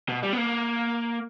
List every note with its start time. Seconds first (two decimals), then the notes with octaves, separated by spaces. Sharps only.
0.09 B2
0.23 G3
0.33 B3
0.37 A#3